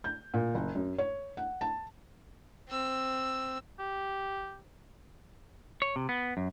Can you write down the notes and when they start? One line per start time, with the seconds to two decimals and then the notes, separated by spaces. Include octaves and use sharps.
0.04 G6
0.34 A#2
0.55 F#1
0.75 F#2
0.98 C#5
1.37 F#5
1.61 A5
2.69 C4 E6
3.79 G4
5.82 C#5
5.96 C3
6.09 B3
6.37 F#2